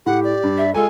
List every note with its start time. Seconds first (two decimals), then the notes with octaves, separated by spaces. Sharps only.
0.06 A2 G4 F#5
0.24 D5
0.43 G2
0.57 E5
0.74 G#3 F4 A4 G#5